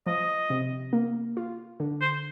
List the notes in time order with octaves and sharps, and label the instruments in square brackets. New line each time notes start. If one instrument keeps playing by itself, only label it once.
[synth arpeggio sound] F3 [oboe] D#5
[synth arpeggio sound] C3
A#3
F4
D3
[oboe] C5